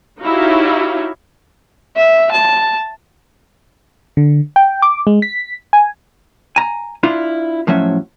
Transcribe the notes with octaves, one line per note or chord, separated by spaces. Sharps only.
D#4 E4 F#4 G4 C#5 F5
E5
A5
D3
G5
D6
G#3
B6
G#5
G#5 A#5
D4 E4 F4
A2 F3 F#3 C#4 E5